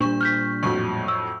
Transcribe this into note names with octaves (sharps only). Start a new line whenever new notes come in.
A#2 G3 D4 C#6
F6 G6 B6
F2 A2 F#3 C#6
E6